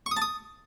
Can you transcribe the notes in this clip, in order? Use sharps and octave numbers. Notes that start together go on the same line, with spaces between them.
C#6
D#6
A5
D#6